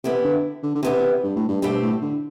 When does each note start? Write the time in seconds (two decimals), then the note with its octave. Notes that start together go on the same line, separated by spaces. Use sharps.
0.04 C3 E3 B3 E4 G4
0.24 D3
0.63 D3
0.75 D3
0.83 C3 E3 B3 E4 G4
1.23 G2
1.36 A2
1.49 G2
1.62 G2 B2 A3 C4 G4 C5
1.82 A2
2.02 D3